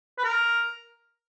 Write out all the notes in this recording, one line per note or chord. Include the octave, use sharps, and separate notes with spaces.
B4
A#4